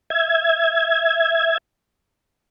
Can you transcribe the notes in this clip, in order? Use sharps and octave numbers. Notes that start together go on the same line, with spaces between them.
E5 G#6